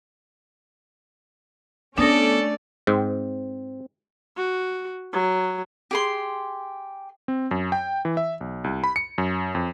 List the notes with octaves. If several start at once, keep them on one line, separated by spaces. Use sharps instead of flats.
A3 B3 C#4 D4 A4 D5 D#6 A#6
G#2 C4
F#4
F#3
G4 G#4 C6
C4
F#2
G5
E3
E5
B1
C2
B5
C#7
F#2
F2